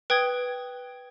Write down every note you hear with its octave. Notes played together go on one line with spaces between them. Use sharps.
B4 G5 D#6 G#6 G7